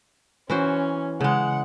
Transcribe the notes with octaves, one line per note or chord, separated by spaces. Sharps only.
E3 C#4 F#4 C5
C#3 G#3 F#5